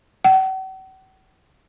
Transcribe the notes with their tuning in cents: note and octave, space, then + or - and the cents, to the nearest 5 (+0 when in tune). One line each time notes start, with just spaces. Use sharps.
F#5 +45